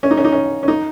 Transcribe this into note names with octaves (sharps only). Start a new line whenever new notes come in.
C#4
D#4
C#4
D#4
C#4
C#4
D#4